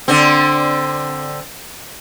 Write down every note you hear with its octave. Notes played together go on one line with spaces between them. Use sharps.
D3 C4